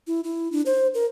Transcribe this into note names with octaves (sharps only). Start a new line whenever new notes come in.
E4
E4
D4
C5
A#4